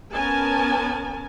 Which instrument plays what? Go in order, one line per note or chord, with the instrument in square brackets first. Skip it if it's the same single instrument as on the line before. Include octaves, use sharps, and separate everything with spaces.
[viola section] B3 C#4 A#4 G#5 A5